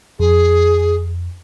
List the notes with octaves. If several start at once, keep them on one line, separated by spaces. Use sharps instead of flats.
F2 G#4